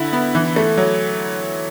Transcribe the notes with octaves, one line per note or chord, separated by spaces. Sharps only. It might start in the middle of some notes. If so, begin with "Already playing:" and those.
Already playing: D3 E4
B3
E3
A3
F#3